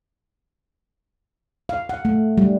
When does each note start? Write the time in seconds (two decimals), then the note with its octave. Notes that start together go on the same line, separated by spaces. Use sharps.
1.69 F5
1.89 F#5
2.05 A3
2.38 G3